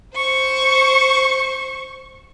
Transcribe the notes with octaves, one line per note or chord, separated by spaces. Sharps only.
C5 C#6